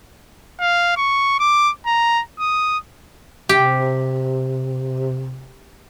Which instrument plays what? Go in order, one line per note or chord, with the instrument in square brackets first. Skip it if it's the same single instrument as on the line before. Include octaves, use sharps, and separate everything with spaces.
[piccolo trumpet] F5
C#6
D6
A#5
D#6
[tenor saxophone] C3 [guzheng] G4